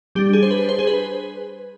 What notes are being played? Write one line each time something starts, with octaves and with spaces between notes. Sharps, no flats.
G3 D4 G4
G#4
C5
B4
C5
G#4
B4